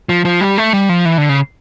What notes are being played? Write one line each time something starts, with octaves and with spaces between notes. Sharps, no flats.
F3
F3
G3
A3
G3
F3
E3
D3
C#3